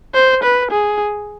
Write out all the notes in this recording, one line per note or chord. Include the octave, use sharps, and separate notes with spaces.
C5
B4
G#4